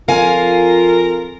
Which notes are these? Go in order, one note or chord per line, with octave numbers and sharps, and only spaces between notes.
F2 F4 A#4 F5 G#5